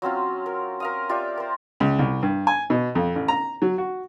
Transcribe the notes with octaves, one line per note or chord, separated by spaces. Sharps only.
F#3 C4 C#4 F4
A#4
A#4 F5 D#6
F4 G4 D5 E5
A#4 C5
C#2
C2
G2
G#5
B2
F2
A1
A#5
F#3
F#4